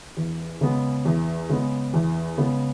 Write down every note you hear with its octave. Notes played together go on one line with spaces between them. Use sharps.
E2
C#3 G#3 B3
E2
C#3 G#3 B3
E2
C#3 G#3 B3